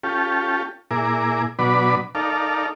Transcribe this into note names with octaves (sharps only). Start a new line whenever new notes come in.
C#4 F4 G4 A4
A#2 E4 G#4 A#4 D6
B2 F#3 D4 B4 D5 B5
D#4 A4 A#4 D5 F5